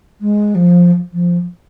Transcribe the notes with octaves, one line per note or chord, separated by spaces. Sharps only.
G#3
F3
F3